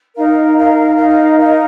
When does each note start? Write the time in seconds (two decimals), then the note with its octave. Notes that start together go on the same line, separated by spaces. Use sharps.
0.15 D#4 A#4 F5
0.55 D#4 A#4 F5
0.97 D#4 A#4 F5
1.38 D#4 A#4 F5